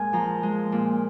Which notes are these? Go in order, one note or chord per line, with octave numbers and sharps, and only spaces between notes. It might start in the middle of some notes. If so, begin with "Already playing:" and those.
Already playing: A#2 G#3 G#5
F3 A#5
G#3
A#2